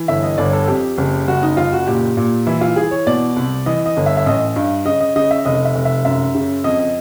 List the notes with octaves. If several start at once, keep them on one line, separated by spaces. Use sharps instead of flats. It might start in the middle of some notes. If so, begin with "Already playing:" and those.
Already playing: E3
G1 E5
D#5
G1 D5
A4
F2 G4
F#1
F#1 F#4
D#4
F#1 F4
F#4
A#2 G4
A#2
E3 E4
F4
E3 G#4
C#5
B2 D5
C2
E3 D#5
D#5
G1
E5
E5
A1 D#5
G2
C#3 D#5
D#5
C#3 D#5
E5
F1 D#5
E5
F1
E5
F#2 E5
C#3
F2 D#5
D#5